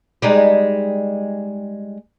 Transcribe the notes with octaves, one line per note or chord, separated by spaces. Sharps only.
G3 G#3 D#4